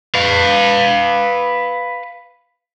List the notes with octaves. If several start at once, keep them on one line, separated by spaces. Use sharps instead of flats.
B4 F5